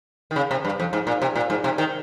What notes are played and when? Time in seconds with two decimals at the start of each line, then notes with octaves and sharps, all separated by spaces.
0.31 D#3
0.36 C#3
0.51 C3
0.65 G2
0.80 F2
0.93 G#2
1.07 A#2
1.22 C3
1.36 A#2
1.50 G#2
1.64 C3
1.78 D#3